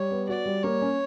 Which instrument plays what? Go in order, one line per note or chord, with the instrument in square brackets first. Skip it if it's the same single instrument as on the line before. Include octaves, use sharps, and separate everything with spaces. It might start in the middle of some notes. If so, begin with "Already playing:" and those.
Already playing: [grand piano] G3 [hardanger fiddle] C#5
[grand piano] B3
[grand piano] F#4 [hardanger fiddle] D5
[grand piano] G3
[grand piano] A#3 [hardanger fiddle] C#5
[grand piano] C#4